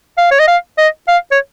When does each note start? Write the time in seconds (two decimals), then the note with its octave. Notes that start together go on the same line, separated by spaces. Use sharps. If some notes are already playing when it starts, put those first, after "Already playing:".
0.18 F5
0.31 C#5
0.39 D#5
0.48 F5
0.78 D#5
1.08 F5
1.31 C#5